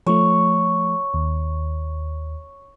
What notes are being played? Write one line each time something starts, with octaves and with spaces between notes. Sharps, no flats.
F3 A3 C#5
D#2